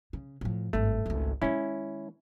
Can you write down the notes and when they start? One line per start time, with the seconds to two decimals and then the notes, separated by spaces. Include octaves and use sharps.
0.13 C#3
0.41 A2 F3
0.73 G#1 G2 A3
1.06 G#1 C#2
1.42 D#3 G#3 C#4 E4